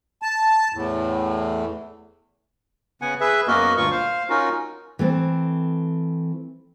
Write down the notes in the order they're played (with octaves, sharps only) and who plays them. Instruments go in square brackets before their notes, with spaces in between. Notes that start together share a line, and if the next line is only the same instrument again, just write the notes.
[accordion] A5
E2 A2
[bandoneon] C#3 B3 F#5 G#5
G#4 B4 E5
F#2 A#3 B3 F#4 A#4 D#5
D2 G2 A#2 F4 C#6
C5 F5
C#4 D#4 F4 F#4 A#4
[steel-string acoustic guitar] E3 A3 C4